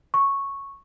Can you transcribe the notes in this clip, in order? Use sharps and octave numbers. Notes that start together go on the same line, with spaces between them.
C#6